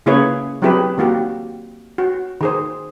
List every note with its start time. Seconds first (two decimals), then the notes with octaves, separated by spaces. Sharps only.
0.06 C#3 A#3 E4 G#4 B4 C#5
0.62 F#3 C4 E4 G4 G#4 B4
0.98 D#3 A#3 F#4 G4
1.98 F#4
2.41 D#3 G#4 C5